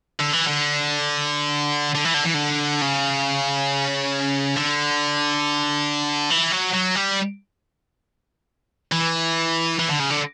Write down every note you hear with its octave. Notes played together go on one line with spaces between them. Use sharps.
D3
E3
D3
D3
E3
D3
E3
D3
C#3
D3
E3
F#3
F#3
G3
E3
E3
D3
C#3
D3